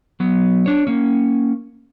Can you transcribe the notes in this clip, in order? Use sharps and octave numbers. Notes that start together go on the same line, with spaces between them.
F#3 B3
D4 C#5
A#3 C#4